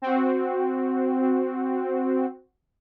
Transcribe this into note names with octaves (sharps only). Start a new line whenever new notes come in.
C4 F#4